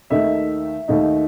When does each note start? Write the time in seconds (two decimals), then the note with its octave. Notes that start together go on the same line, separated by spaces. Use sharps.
0.10 D#2 D#3 A3 D#4 E5
0.88 D#2 D#3 A3 D#4